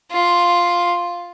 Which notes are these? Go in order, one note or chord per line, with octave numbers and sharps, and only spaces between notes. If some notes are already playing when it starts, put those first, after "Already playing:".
F4